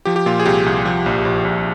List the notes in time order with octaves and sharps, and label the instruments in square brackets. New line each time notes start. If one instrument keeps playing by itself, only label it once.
[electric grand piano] F3 G4
G4
A#2 F4
G#4
C2 G4
C2
F3
A#1
A#1
A#1